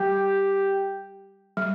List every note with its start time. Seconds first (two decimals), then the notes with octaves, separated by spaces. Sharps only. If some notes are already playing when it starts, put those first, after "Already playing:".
Already playing: G3 G4
1.57 G3